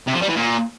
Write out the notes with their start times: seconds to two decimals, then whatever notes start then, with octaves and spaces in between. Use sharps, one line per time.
0.07 C3
0.14 F3
0.21 G3
0.28 E3
0.35 A#2